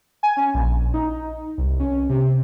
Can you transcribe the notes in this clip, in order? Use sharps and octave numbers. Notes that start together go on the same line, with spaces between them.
G#5
C#4
A#1
D#4
C2
C#4
C3